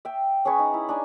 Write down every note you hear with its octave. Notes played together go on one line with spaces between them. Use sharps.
E5 G5
C#4 G#4 B4 C#5
D#4
E4
D4 D#4 G#5